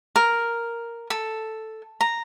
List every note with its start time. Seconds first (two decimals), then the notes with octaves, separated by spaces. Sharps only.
0.16 A#4
1.10 A4
2.01 A#5